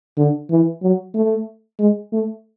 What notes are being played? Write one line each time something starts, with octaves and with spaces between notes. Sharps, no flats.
D3
E3
F#3
A3
G#3
A3